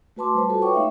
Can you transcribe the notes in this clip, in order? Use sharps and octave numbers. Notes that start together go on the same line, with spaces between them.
A3 F#4 B4 A5 C6 D6
G3 C5 A5
F4 F#4 A4 B4
C#5 F#5 G5 C#6 D6
A3 D#4 E5 F5